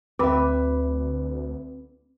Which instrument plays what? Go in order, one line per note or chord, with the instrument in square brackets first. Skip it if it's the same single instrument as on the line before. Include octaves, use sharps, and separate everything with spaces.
[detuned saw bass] D2 [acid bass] C4 [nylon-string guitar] B4 E5 [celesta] B5 D6